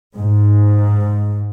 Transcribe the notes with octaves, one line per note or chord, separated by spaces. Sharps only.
G#2